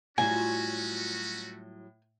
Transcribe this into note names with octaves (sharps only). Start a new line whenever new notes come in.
A2 F#3 G3 A3 C#4 F4 F#4 G#5